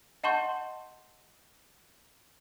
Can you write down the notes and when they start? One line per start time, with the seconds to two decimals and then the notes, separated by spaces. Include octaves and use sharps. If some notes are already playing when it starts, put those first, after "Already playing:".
0.24 D#5 F#5 A5 C6 C#6 G6